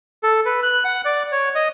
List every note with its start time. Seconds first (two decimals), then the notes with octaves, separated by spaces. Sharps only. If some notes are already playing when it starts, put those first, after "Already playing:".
0.23 A4
0.46 B4
0.63 F#6
0.85 F#5
1.05 D5
1.32 C#5
1.55 D#5